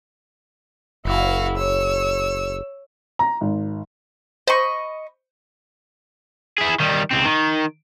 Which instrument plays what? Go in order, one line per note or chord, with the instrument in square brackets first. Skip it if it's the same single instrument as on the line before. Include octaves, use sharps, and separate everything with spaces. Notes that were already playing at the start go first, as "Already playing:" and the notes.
[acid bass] F#1 [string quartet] E4 F#4 F5
[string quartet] C#5 E6
[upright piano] A#5
G#1
[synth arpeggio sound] C5 [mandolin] D#5 B5 C#6
[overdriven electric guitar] E4 G#4
D#3 G3
C#2 C4
D#3